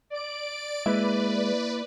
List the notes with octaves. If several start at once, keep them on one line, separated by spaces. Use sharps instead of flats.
D5 D7
G#3 A#3 E4 B4 D5 E5